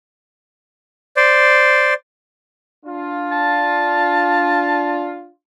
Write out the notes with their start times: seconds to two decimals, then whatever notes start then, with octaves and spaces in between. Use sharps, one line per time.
1.17 C5 D5
2.85 D4 F4
3.31 A5